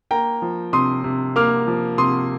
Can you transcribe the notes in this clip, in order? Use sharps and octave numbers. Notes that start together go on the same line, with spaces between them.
A#3 G5 A#5
F3
C3 C6 D#6
C3
A#3 D6 F6
F3
C3 C6 D#6